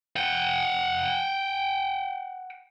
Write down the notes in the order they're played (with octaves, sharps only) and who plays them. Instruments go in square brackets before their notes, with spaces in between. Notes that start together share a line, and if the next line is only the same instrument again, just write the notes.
[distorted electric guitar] F#5 G5